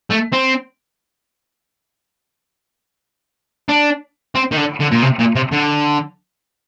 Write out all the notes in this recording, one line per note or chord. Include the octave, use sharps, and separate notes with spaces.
A3
C4
D4
C4
D#3
D3
D3
A#2
C3
A#2
C3
D3